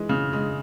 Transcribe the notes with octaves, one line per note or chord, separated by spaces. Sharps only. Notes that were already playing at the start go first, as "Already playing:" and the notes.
Already playing: E3 G#3
C#3
G#3